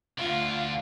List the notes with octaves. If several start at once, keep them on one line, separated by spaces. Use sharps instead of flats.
D2 D3 F4